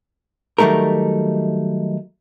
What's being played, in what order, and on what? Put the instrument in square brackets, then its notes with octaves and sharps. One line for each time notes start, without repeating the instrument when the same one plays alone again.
[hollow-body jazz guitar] D#3 F#3 G3 A3 D#4 A#4